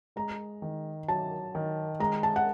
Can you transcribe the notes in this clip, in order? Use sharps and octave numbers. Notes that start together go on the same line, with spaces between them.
G#3 A#5
D#3
F#3 A5
D#3
G#3 A#5
A5
F#5